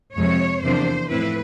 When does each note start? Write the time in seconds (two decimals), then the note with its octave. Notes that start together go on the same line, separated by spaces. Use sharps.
0.16 F2 C3 F3 G#3 C#5
0.63 E2 C3 F3 A#3 D4 C5
1.10 A2 F3 A3 C4 E4 B4